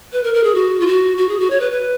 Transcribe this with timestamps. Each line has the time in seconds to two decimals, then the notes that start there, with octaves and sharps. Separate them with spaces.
0.13 B4
0.24 A#4
0.34 A#4
0.44 G#4
0.55 F#4
0.80 F4
0.86 F#4
1.18 F#4
1.29 G#4
1.39 F#4
1.51 C#5
1.60 B4
1.71 B4